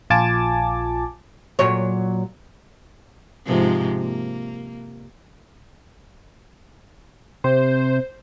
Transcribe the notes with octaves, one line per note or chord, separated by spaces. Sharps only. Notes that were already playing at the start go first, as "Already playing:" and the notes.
A#1 F4 G#5 A5 D6 A6
A#2 F#3 C#5
G#2 C3 F3
A#3
C3 C5